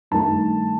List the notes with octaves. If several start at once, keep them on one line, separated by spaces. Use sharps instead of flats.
G2 D#3 A3 A5